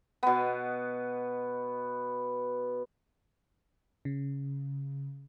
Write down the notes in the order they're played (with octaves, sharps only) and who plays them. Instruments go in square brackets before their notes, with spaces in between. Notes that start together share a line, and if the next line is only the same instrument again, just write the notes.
[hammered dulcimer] B2 B3
[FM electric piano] C#3